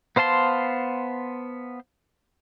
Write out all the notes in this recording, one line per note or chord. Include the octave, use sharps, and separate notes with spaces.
B3 C5 F5 A5 C6